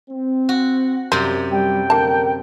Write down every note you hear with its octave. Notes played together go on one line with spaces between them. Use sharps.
C4
F#4
F#2 C3 G3 C5
G3 G5
D3 A#3 D4 A#4 A5